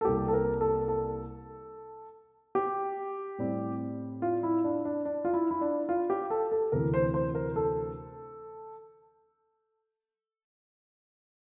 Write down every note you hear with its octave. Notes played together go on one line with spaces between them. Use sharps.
A4
C2 C3 G3 A#3 G4
A4
A#4
A4
A4
G4
A2 G3 C4
F4
E4
D4
D4
D4
F4
E4
E4
D4
F4
G4
A4
A4
D2 C3 E3 A#4
C5
C5
A#4
A4